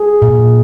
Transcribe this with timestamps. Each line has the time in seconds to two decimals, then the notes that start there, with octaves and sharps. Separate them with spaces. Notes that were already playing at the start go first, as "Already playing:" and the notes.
Already playing: G#4
0.22 A#2